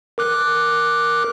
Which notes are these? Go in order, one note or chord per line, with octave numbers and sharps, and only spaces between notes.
A#4 D6 F#6